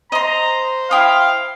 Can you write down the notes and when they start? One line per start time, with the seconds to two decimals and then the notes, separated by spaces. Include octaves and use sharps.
0.12 C5 D#5 A#5 C6
0.91 E4 F5 G5 D#6